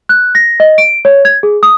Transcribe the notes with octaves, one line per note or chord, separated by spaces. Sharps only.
F#6
A#6
D#5
D7
C#5
G#6
G#4
D#6